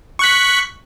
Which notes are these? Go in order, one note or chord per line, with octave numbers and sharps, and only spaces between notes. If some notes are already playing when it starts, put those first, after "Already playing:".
C#6 F#6 B6